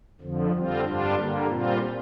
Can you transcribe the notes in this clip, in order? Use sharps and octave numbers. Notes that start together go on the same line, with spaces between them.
F2 D3 F3
D3 G3 C4 F4
G2 G3 D4 F4
D3 G3 A#3
A#2 G3 C4 F4